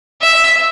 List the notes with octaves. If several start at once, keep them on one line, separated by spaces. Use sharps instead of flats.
E5